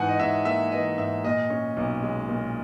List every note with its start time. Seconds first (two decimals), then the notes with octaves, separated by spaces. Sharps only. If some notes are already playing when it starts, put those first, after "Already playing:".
Already playing: G#2 E3 F#5 G#5
0.09 D#5
0.20 G#2 E5
0.45 A#3 E5
0.72 E3 D#5
0.98 G#2 E5
1.24 A#2 D#5
1.50 C#4
1.77 B1
2.03 G#3
2.29 A#2